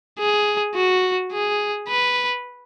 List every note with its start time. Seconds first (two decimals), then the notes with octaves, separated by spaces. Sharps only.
0.19 G#4
0.75 F#4
1.32 G#4
1.88 B4